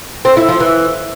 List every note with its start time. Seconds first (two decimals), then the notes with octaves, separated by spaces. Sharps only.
0.25 C4
0.37 E4
0.49 F3
0.60 E3